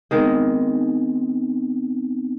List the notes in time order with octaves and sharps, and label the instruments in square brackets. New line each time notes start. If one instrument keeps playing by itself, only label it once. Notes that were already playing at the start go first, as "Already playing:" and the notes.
[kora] D#3 G#3 [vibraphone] B3 C4 D#4